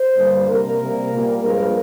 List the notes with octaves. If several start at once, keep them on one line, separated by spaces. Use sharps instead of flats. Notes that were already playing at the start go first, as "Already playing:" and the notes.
Already playing: C5
G2 D3 G3 A#3
C3 G3 A#3 A#4
C3 G3 A#3
A#2 G3 A#3
G2 F3 G#3 A#4